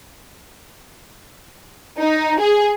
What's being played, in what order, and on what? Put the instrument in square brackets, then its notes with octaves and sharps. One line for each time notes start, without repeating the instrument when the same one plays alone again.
[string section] D#4
G#4